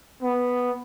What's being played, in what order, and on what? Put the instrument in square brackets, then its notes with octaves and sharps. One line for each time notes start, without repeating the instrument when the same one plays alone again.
[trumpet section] B3